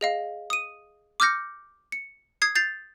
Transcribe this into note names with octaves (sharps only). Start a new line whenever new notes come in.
G#4 D#5 F5
D#6 D#7
D6 E6 F6 G6 A#6 C#7
C#7
D#6 G#6 C7
G6 A6 C7 F7